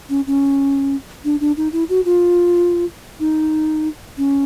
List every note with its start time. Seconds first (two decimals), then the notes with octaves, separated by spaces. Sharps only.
0.09 C#4
0.27 C#4
1.25 D4
1.41 D4
1.57 D#4
1.73 E4
1.89 F#4
2.05 F4
3.20 D#4
4.18 C#4